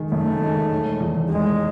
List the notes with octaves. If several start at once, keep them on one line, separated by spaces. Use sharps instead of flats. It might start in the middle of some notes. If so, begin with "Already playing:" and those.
Already playing: D#3 G#3
F#2 A3
D#3 G#3
E1
E2 D#3
E1 G#3